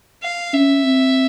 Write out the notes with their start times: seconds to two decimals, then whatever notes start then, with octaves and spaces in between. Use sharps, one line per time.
0.23 F5
0.53 C#4 E5
0.84 C4